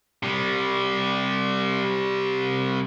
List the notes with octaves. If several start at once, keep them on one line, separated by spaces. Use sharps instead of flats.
C3 G3